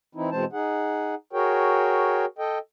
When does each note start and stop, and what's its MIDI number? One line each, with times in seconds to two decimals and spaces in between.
0.15 0.30 52
0.15 0.30 60
0.15 0.30 63
0.15 0.30 64
0.31 0.45 47
0.31 0.45 52
0.31 0.45 56
0.31 0.45 60
0.31 0.45 72
0.31 0.45 81
0.53 1.15 63
0.53 1.15 68
0.53 1.15 78
1.33 2.25 66
1.33 2.25 68
1.33 2.25 70
1.33 2.25 73
1.33 2.25 79
2.39 2.58 69
2.39 2.58 75
2.39 2.58 79